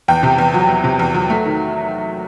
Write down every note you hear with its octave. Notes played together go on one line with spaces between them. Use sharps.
E2 G5
C3
E2
F#3
E2
C3
E2
F#3
A3
D#3